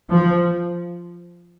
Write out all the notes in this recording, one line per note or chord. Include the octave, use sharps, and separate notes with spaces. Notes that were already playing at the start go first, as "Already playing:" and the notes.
F3